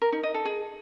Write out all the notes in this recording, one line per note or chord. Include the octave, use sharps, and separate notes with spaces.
A#4
D#4
D#5
A4
G#4